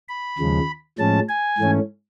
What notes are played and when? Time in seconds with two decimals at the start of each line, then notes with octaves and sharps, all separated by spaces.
0.09 B5
0.39 D#2 C#3 F3 G#3
0.98 A2 F3 G#3 C#4 A5
1.29 G#5
1.58 G#2 E3 A3 C#4